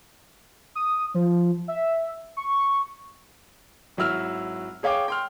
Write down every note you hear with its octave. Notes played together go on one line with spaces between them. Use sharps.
D#6
F3
E5
C#6
G#1 F#3 E4 E6 F6
G#4 C#5 F5 G5 D6
G5 C6 F6